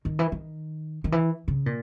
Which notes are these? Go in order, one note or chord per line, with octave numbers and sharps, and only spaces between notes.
D#3
E3
D#3
D#3
E3
C#3
A#2